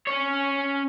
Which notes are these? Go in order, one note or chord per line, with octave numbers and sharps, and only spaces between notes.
C#4 C#5